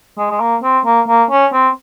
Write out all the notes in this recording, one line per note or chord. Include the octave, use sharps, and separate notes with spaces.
G#3
G#3
A#3
C4
A#3
A#3
C#4
C4